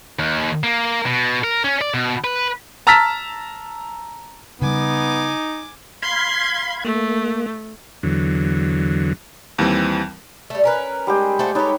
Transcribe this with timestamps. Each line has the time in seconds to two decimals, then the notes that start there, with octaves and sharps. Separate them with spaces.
0.19 D#2
0.64 A#3
1.06 B2
1.44 A#4
1.64 C#4
1.81 D5
1.94 B2
2.24 B4
2.87 A5 A#5 E6 F6 A6 B6
4.62 C#3 G3 B3 D#4 G#5 D6
6.03 F5 B5 C6 G#6
6.85 A3 A#3
8.03 E2 D3 F#3
9.59 D#2 E3 G3 C4
10.50 G3 A3
10.64 C#4 A#4 B4
11.07 G3 G#3 G4
11.39 A3 F#4 C5
11.55 D#4 G4 A4 B4 C#5